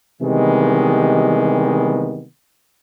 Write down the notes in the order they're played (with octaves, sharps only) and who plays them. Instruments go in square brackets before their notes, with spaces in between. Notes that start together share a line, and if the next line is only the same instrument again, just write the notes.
[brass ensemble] C3 D#3 E3 G3 G#3 B3